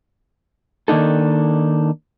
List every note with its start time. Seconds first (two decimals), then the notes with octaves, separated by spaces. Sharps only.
0.88 D#3 A#3 D4 D#4 A4